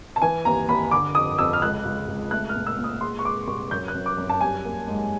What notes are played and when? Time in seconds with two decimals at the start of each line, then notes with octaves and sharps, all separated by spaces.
0.16 A5
0.22 E3 G#5
0.45 D#2 A#5
0.69 D#2 B5
0.91 D3 D6
1.15 F2 D#6
1.38 F2 E6
1.53 F6
1.62 C#2 F#6
1.85 C#2
2.08 C#2
2.31 A3 F#6
2.49 F6
2.56 A#2
2.66 E6
2.78 A#2
2.84 D#6
3.01 G#3 C6
3.19 C#6
3.25 G#3 D6
3.47 C2 C#6
3.71 F#2 G6
3.88 F#6
3.95 F#2
4.06 D6
4.18 F#2
4.29 A5
4.41 G3 G#5
4.65 A#3
4.88 G#2